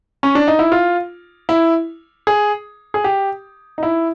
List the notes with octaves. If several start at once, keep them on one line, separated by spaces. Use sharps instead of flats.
C#4
D4
D#4
E4
F4
E4
G#4
G#4
G4
D#4
E4